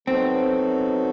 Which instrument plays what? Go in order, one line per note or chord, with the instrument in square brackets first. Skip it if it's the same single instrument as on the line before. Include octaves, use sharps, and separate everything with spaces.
[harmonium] F#3 B3 D#4 F#4 A4 [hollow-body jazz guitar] C4